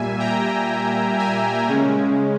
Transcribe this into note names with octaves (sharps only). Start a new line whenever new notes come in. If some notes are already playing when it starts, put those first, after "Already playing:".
Already playing: A#2 G3 A#3 E5 G#5
G5 A#5
E5 G#5
C#3 G#3 C#4